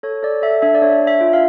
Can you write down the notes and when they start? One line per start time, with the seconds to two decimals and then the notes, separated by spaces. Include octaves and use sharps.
0.03 A4 C#5
0.23 A4 D5
0.42 A4 E5
0.62 D4 E5
0.75 D5
0.82 D4 C#5
1.01 D4
1.07 E5
1.21 F4
1.33 F5